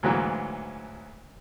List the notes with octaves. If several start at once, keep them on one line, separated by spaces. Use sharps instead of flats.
D2 G#2 E3 F#3 A#3